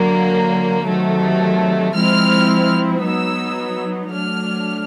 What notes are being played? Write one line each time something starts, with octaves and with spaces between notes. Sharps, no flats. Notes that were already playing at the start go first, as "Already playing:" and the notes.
Already playing: D3 F#3 A#3
C3 D#3 F#3 A3
F3 G#3 C4 E4 F6
F#3 B3 D#4 E6
F#3 A3 D4 F6